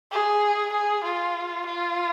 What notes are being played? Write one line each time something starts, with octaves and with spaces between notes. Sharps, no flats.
G#4
G#4
F4
F4